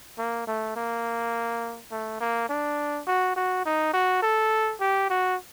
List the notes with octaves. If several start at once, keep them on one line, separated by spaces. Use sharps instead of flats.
A#3
A3
A#3
A3
A#3
D4
F#4
F#4
D#4
F#4
A4
G4
F#4